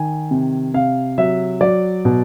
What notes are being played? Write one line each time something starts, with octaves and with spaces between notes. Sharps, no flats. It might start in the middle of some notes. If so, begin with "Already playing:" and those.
Already playing: D#3 G#5
C3
C3 F5
F#3 E5
F#3 D5
B2